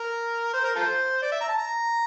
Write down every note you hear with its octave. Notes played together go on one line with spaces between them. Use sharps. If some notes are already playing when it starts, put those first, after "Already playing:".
Already playing: A#4
C5
A#4
F4 A4 C5
D5
E5
A#5
A5
A#5